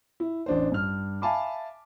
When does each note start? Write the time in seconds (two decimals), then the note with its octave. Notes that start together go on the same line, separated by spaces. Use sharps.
0.20 E4
0.46 A1 D4 C5
0.72 G2 F6
1.22 E5 F5 G#5 A5 B5 D6